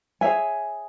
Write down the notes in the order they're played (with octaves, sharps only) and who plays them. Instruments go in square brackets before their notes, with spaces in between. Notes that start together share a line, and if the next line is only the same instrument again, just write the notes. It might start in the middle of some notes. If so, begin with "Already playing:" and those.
[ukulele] G#4 C#5 E5 G#5